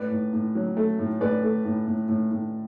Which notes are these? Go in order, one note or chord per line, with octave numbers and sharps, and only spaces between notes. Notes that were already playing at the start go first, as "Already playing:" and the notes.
Already playing: A2 B4 D5
A2
A2
F#3
A3
A2
A2 B4 D5
A3
A2
A2
A2
A2